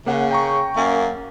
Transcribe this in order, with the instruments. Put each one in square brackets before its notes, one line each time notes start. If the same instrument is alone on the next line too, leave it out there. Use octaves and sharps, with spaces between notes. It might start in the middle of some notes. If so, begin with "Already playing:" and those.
[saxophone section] C#3 [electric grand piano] A#3 F#5
[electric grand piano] G5 A#5 C#6
[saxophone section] F#2 A#3